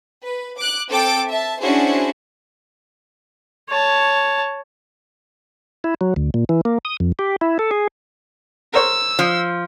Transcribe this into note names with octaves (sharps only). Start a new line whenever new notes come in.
B4
D6 F#6
C4 A4 G5 D6 A6 D7
E5 A5
C#4 D4 E4 F#4 G#4 C5
C#5 A5
E4
F#3
D2
A#2
E3
A#3
D#6
F2
G4
E4
A4
G#4
A#4 C5 C#5 E6
F3